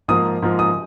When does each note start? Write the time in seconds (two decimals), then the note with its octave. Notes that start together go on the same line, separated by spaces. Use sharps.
0.08 G#2 F3 A#3 F4 A#4 D#6
0.42 G#2 F3 A#3 F4 A#4
0.59 D#6